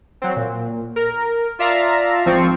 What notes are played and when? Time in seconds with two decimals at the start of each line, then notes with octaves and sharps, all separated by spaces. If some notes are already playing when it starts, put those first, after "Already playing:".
0.22 F#3 C4
0.36 A#2
0.96 A#4
1.59 F4 D5 E5 F5 A5 A#5
2.25 G#1 F3 C4 F4 C#6